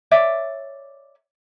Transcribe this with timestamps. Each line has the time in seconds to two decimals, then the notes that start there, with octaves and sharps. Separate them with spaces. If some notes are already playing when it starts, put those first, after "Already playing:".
0.11 C#5 D5 E5